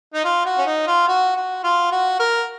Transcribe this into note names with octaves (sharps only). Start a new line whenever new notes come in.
D#4
F4
F#4
C#4
D#4
F4
F#4
F#4
F4
F#4
A#4